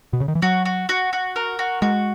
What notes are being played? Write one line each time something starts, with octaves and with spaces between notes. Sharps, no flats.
B2
C#3
D#3
E3
F#3 F#4
F#4
F#4
F#4
A#4
F#4
G#3 F#4